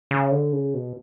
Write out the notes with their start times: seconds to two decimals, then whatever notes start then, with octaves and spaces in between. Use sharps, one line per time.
0.11 C#3
0.32 D3
0.53 C#3
0.74 B2